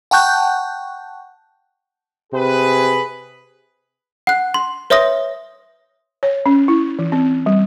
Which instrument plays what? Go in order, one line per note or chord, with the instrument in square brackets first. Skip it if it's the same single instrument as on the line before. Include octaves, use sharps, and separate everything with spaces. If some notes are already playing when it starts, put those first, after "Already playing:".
[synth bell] F#5 G5 A5 C#6 F#6 G6
[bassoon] C3 [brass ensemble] G#4 B4
[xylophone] F#5 F#6
C6
B4 C#5 E5 C6 D#6 A#6
[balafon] C#5
C#4
E4
E3
C4
G3